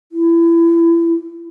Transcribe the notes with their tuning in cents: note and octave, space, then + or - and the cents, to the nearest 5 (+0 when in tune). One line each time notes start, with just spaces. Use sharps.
E4 +30